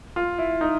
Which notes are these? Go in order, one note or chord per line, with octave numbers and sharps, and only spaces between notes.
F4
E4
D#4